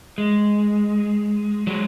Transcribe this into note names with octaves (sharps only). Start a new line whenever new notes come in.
G#3
F#3 G#3